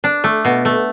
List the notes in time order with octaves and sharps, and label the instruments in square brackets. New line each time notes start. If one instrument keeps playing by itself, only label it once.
[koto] D4
A3
B2
A3